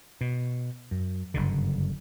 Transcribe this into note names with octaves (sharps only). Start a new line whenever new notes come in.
B2
F#2
F#1 G2 D3